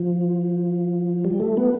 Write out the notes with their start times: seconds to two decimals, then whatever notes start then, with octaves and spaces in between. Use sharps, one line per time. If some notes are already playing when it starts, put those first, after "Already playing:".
Already playing: F3
1.25 G3
1.40 A3
1.57 B3